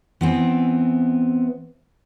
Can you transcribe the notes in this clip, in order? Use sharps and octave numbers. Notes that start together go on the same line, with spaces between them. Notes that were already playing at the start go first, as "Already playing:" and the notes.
E3 B3 C4